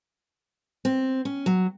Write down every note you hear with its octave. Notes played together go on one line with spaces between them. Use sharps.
C4
C#4
F#3